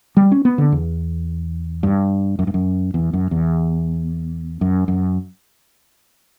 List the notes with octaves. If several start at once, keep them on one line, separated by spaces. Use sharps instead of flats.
G3
C#4
B3
D3
E2
G2
F#2
G2
F#2
E2
F#2
E2
F#2
F#2